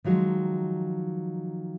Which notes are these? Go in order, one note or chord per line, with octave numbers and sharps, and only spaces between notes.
D#3 F3 F#3 G#3